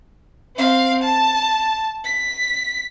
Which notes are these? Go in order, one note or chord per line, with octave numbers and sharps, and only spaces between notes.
C4 F5
A5
B6